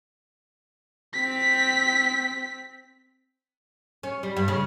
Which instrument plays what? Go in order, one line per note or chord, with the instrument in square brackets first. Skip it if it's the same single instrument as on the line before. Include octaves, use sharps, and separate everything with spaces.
[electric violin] C4 B6
[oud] C#4
G3
G2
C#3